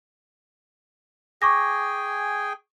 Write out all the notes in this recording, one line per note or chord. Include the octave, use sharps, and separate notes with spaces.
G#4 G5 G#5 C#6 D6 A#6